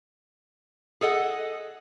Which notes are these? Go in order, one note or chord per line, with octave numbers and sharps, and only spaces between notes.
G#4 A4 D#5 F#5